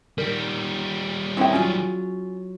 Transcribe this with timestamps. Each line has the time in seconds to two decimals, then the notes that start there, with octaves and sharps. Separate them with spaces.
0.18 D#3 G3 A#4
1.37 C4 C#4 D#4 E4 G5
1.53 F#3 C#4 F4 G#4